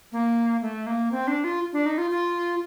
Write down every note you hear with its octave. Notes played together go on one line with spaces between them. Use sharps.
A#3
A3
A#3
C4
D4
F4
D4
D#4
F4
F4